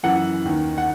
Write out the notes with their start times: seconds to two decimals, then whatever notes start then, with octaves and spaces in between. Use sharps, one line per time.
0.03 F#2 E3 F#5
0.45 D#2 D#3
0.78 F#5